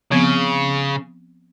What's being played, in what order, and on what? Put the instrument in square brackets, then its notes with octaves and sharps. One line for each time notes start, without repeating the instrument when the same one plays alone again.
[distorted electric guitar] C#3 [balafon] F3 B3 C4